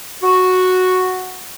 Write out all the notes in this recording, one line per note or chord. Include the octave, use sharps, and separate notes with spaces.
F#4